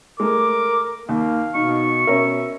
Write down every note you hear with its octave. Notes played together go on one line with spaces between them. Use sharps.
G#3 A3 A#4 D6
D#2 A#3 F5
B2 D#4 C#6
B2 C#4 A#4 E5